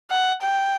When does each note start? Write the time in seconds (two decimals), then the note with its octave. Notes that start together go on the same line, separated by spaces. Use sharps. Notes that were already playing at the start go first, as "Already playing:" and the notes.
0.11 F#5
0.42 G5